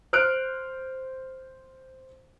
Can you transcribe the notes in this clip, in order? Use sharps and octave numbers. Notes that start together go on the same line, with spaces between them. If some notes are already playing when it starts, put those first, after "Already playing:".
C5 F6 F#6 D7